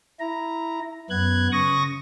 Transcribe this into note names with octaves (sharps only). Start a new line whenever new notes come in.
E4 A#5
F#2 B3 F#6 G#6
C#3 C#6 D#6 A#6